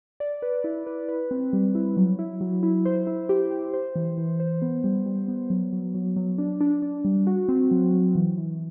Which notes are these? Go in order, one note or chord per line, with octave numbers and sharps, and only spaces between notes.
D5
B4
E4
B4
B4
C4
G3
E4
F#3
E4
F#3
E4
C5
E4
G4
G4
C5
E3
E3
C5
B3
G3
G3
B3
F#3
F#3
F#3
F#3
D4
D4
D4
G3
F#4
C4
F#3
F#3
E3
E3